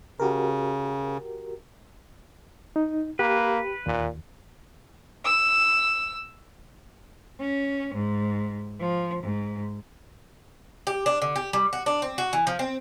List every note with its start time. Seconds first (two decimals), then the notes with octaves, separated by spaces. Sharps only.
0.20 C#3 F#4 G4 A#4
2.76 D#4
3.19 A#3 G4 B4
3.87 D#2 A#2
5.25 E6
7.40 C#4
7.95 G#2
8.80 F3
9.23 G#2
10.87 G4
11.06 D4
11.22 D3
11.36 G4
11.53 G3
11.73 F#4
11.86 D4
12.02 C4
12.18 F#4
12.33 E3
12.47 F3
12.59 C4